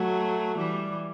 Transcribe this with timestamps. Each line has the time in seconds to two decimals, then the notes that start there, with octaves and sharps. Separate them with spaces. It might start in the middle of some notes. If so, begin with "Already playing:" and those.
Already playing: F#3 A3
0.57 E3 G3